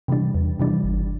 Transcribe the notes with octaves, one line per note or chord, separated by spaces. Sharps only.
C3 E3 G3 D4
E2
C3 E3 G3 D4
G1